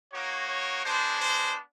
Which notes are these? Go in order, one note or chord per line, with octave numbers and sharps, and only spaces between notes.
A#3 D#4 F#4 C#5
C#5
G#3 B3 D4 C5
C5